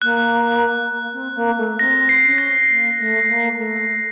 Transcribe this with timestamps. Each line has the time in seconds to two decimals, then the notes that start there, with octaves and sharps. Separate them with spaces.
0.02 A#3 F#6
0.91 A#3
1.13 C4
1.35 A#3
1.58 A3
1.79 C4 A#6
2.09 C7
2.23 C#4
2.38 A#6
2.69 A#3
2.98 A3
3.28 A#3
3.57 A3